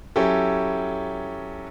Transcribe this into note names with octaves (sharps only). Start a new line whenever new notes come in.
F#3 C#4 E4 G4 A4